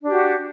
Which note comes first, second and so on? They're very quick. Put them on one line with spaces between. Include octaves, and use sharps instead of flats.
D4 G4 F#4